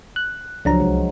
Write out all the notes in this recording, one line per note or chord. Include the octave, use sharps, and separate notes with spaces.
F#6
C#2 F3 F#3 D4 A#5
C2 G#3